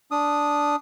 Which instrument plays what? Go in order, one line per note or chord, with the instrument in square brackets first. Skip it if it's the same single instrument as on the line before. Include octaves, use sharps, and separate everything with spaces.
[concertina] D4 D#6